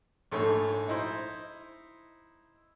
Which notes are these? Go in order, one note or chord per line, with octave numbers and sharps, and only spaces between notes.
A#1 G#2 A3 A4 C#5
D#4 E4 C5